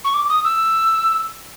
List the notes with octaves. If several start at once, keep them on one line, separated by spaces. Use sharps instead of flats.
C#6
D6
D#6
E6